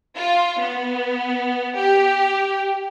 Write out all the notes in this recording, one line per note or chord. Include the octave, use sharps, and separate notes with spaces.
F4
B3
G4